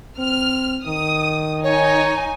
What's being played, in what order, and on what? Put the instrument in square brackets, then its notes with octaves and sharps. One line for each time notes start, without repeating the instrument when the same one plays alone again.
[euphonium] C4 [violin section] F6
[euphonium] D#3 [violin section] D#6
[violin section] D#4 G#5 [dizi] C#5